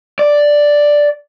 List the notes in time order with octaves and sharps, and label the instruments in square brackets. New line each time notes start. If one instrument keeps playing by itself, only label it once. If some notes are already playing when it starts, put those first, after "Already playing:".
[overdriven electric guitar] D5